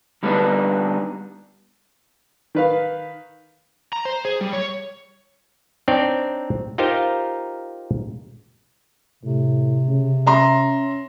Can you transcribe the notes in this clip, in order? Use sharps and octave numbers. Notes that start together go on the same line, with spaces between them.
D3 G3 A3 B3 D4 D#4
D#3 B4 F5
A#5
C5
G#4
G3
C#5
C4 D4 D#4 C#5 D5
D#4 F4 G4 A#4 C5 F5
A2 C3
C#3
C#4 E5 A#5 C6